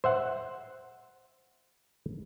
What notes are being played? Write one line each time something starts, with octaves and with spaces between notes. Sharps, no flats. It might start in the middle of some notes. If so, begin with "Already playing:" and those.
C5 E5 F#5